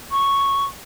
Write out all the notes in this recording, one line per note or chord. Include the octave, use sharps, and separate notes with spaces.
C#6